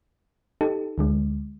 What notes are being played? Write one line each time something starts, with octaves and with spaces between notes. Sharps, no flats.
D#4 G4 A4
D2 D3 G#3